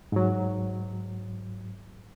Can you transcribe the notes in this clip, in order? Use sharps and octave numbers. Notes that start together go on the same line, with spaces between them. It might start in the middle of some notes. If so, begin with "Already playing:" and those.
G#2 F#3